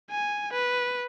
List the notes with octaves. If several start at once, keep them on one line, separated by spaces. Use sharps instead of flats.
G#5
B4